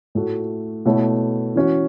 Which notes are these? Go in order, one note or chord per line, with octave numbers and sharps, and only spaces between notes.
A2 A3 F#4
B2 A3 E4 A4 C#5
E3 C#4 F#4